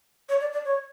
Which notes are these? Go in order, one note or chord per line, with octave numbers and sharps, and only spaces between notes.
C#5
D5
D5
C#5